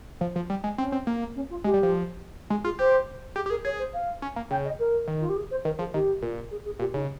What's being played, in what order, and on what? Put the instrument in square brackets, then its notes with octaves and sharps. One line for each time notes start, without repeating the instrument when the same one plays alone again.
[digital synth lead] F3
F3
G3
G#3
[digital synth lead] C4 [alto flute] C#4
[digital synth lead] C4
A#3
[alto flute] C#4
F4
[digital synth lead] G#3 [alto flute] G4
[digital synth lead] G3
F3
[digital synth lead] G#3 [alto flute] G#4
[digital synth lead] F4 [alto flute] G#4
[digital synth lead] G4 [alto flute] C5
[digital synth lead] G4 [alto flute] G#4
[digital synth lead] G4
[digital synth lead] G#4 [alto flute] A#4
[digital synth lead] G#4 [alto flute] C#5
[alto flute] C5
F5
[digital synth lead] C#4
A#3
[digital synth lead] C#3 [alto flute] G5
[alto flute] D#5
A#4
[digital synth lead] D#3
[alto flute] F4
G4
G#4
C5
[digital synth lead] D#3 [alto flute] A#4
[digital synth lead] F3 [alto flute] G#4
[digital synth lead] D#3 [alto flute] G4
[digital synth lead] A#2
[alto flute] G#4
G#4
[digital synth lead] A#2 [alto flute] G4
[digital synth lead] C#3 [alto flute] D#4